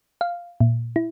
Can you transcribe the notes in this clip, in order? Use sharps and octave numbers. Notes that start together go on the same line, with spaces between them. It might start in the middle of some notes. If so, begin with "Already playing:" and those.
F5
A#2
E4